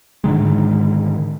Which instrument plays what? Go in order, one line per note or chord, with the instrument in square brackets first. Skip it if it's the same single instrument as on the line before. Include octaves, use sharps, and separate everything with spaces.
[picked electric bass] G#2 D3 D#3 G#3